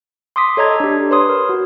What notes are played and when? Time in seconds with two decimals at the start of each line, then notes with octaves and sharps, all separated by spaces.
0.36 C6 D6 D#6 B6
0.57 A4 C#5 D#5 A#5 G#6
0.80 D4 G4
1.11 B4 C#5 C6 D#6
1.29 A#4
1.49 F#4